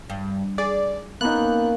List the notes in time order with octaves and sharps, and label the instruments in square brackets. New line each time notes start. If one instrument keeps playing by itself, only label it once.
[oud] G2
[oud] G#4 [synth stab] D5
[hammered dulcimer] A#3 C#4 [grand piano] B3 D#4 [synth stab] F#6